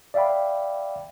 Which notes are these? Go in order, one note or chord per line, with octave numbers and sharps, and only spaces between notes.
D5 E5 F5 G5 B5